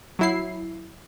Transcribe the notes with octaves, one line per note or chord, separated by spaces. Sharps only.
F#3 E4 C7